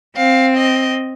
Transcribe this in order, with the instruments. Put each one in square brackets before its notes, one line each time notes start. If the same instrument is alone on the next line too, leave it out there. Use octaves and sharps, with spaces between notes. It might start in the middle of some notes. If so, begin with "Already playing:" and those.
[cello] C4 [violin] F5
[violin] D#5